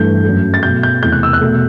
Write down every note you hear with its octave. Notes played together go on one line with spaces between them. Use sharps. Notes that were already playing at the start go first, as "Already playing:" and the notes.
Already playing: G2 E3 A3 G6
F#2 F#3 A3
A6
B2 F#3 A3 G6
G6
E2 C3 E3 A3 G6
F#6
E6
F#6
B2 A3